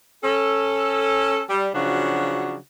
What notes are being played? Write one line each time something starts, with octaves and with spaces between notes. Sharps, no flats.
C#4 A4
G3
C#3 F3 F#3 D4 F#4